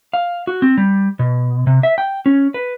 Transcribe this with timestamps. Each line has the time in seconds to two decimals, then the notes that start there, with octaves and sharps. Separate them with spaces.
0.13 F5
0.47 F#4
0.62 C4
0.78 G3
1.19 B2
1.67 C3
1.83 E5
1.98 G5
2.26 C#4
2.54 B4